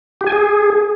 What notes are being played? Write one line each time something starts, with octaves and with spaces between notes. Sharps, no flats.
G4
G#5
G#4